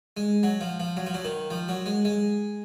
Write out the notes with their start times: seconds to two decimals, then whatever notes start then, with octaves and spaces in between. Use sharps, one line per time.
0.17 G#3
0.43 F#3
0.61 F3
0.80 F3
0.97 F#3
1.06 F3
1.14 F#3
1.24 D#3
1.51 F3
1.68 F#3
1.86 G#3
2.05 G#3